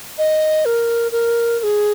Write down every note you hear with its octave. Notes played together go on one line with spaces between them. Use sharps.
D#5
A#4
A#4
A#4
G#4